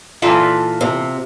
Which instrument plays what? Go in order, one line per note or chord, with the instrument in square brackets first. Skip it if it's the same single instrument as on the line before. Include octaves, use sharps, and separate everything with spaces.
[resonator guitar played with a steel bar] A#2 E3 A5 [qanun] F4 A4 B4
[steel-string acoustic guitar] C3